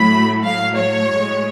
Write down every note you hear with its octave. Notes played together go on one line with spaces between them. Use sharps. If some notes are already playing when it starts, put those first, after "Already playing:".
Already playing: A2 F#3 A3 B5
A2 F#3 A3 F5
C#5
A2 G#3